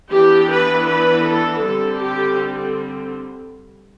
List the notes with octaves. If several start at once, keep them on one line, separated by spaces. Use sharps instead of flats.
E3 B3 D4 G4
B4
B4
A4
D3 G3 C4 A4
G4